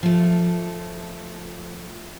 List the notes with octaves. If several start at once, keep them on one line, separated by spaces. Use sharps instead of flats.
F3 A3